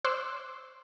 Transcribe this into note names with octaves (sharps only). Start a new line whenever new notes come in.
C5 C#5 C6 D6 E6 F#6